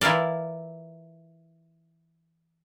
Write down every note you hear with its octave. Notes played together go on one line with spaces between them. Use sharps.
E3 E4 F4 A#4 D5